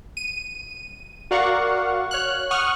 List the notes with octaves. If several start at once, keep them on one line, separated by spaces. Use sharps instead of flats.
D#7
F#4 A#4 D5 F5 F#5 C#6
C#5 F6 F#6
F#5 C#6 D#6 F6 F#6